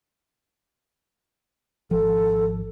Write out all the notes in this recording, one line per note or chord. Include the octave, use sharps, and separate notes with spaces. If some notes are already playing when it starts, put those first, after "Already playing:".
G#1 F3 A4